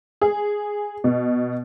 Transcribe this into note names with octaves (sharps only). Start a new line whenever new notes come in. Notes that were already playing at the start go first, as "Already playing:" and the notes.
G#4
B2